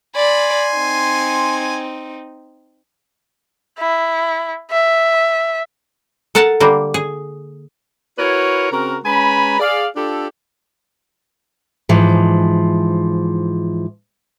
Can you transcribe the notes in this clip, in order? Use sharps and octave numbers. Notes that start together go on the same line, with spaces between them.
D5 G#5 B5 C6
C4 D#4
E4
E5
A4 A#4 F#5 A5
D3 G3 A#3
G#4
E4 F#4 A#4 B4 C#5
C#3 C4 F#4 A#4
G#3 C#4 B4 G#5 A#5 B5
G#4 D5 F5
D4 F4 G4 A4
G#2 E3 F3